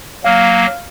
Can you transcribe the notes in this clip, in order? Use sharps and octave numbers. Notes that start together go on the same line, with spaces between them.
F#3 A#3 F5 F6